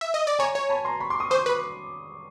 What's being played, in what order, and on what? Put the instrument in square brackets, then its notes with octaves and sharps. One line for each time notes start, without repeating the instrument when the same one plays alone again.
[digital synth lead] E5
D#5
D5
[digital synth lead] C#5 [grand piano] G#5 A#5
[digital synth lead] C#5
[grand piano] A5 B5
A#5 C6
B5 C#6
C6 D6
C#6 D#6
[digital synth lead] C5 [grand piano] C#6 D#6
[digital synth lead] B4